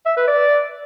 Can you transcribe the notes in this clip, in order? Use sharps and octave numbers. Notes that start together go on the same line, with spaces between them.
E5
B4
D5